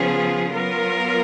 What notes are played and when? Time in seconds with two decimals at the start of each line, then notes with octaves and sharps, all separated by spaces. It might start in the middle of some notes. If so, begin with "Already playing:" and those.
Already playing: C#3 F3 B3 F4 G#4
0.52 F#3 B3 F4 A#4